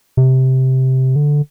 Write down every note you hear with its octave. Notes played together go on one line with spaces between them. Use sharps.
C3
D3